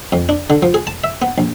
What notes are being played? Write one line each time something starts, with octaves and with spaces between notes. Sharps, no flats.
F2
D4
D3
F3
G#4
A5
E5
B3
A#1